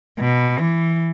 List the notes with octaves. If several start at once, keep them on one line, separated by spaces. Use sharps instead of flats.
B2
E3